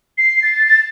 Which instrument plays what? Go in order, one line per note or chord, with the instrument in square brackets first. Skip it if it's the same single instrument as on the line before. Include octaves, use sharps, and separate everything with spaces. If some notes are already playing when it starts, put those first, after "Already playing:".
[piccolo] C7
A6
A6